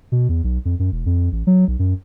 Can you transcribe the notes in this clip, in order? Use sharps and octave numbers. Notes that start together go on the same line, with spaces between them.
B2
E2
B1
F2
F#2
E1
F2
A1
F#3
B1
F#2